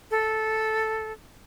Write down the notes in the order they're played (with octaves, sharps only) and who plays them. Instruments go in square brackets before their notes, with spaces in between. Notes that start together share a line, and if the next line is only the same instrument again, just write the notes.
[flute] A4